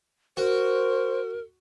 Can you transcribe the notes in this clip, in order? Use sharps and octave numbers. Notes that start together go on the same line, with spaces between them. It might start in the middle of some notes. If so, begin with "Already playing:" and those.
F#4 A#4 C5